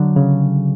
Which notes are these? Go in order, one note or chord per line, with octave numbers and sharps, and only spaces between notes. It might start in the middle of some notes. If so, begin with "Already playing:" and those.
Already playing: D3 F#3
C#3